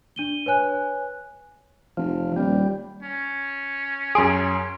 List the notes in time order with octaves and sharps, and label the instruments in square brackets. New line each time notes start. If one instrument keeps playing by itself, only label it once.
[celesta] D4 D#7 G7
B4 C#5 G#5 F#6
[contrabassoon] F1 [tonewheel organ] F3
[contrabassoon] D#1 [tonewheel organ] G3
[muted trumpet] C#4
[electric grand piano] F#2 C6 D7 [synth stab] G#4